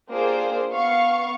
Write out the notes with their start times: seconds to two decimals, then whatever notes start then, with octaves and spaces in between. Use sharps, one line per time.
0.11 A#3 D4 F4 G4 G#4 C5
0.72 B3 F5 C#6